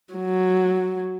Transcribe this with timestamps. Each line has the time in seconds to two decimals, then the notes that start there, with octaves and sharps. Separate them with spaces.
0.14 F#3